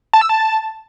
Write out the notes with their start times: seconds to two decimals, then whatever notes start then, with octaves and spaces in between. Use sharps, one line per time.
0.13 A5
0.21 E6
0.29 A5